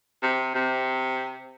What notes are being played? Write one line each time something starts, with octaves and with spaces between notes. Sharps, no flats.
C3
C3